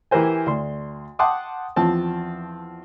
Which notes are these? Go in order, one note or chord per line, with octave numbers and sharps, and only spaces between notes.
E3 G4 A#4 C5 G#5
D2 C6
F#5 G5 A5 C6 D6 D#6
E2 F3 C4 A5